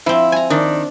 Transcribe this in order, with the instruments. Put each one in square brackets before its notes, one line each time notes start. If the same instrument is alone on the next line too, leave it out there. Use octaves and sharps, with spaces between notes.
[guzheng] F3 C4 [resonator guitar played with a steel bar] E4
[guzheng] G#5 A#5
[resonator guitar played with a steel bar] D#3 [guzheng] D4